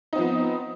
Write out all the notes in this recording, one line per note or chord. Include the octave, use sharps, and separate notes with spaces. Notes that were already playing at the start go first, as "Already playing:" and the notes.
F3 B3 C4 D#4